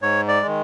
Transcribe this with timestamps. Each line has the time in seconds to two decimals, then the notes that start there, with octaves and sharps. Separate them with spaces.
0.02 G#2 C#5
0.28 D5
0.42 D#3 G#3